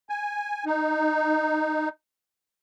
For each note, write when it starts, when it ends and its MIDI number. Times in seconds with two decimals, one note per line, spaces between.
0.09 0.65 80
0.66 1.89 63